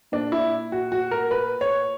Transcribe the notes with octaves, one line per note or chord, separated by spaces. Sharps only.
A#2 D4
E4
F#4
F#4
A#4
B4
C#5